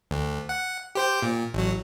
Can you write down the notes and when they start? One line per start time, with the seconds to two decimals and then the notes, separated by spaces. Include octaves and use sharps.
0.11 D2
0.49 F#5
0.95 G4 C5 G5
1.22 A#2
1.54 A1 F#3